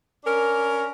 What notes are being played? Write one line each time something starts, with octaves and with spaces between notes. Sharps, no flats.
C#4 D4 A#4